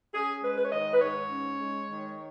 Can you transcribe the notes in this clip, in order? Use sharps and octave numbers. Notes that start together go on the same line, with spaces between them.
C#4 G#4
G#3 B4
B4
C#5
D#3 D#5
B4
G#2 C#5
C#4
G#3
D#3